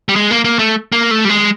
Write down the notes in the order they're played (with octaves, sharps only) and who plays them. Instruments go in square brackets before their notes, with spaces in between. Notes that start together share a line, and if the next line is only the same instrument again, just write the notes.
[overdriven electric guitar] G3
G#3
A#3
A#3
A3
A#3
A3
G3
G#3